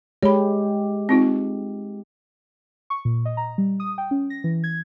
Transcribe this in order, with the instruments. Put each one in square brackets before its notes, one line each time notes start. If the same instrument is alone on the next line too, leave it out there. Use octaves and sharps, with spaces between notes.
[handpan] G#3 G4 [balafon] C#5 B5
[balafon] C4 D#4 F4
[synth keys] C#6
A#2
D#5
A#5
G3
D#6
G5
C#4
A#6
E3
G#6